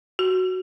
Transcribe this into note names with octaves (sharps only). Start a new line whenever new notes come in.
F#4